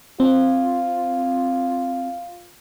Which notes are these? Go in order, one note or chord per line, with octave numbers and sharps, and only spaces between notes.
C4 F4